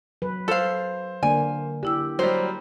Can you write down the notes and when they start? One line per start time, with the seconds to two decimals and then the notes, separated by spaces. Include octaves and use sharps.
0.22 F#3 B4
0.48 A4 C5 F5
1.23 D3 A#3 D5 G#5
1.83 D3 E4 G4 E6
2.19 F#3 G3 C5